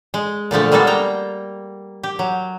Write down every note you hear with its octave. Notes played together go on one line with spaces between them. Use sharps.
G#3
A#2 D3 F3 A3
G3 G#3 A#3 B3 A4
A#3 G5 A#5
G4
F#3